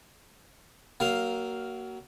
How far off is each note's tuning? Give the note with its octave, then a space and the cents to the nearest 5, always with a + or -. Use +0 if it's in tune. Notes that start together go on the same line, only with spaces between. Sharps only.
F#3 +25 A#3 +0 F5 +0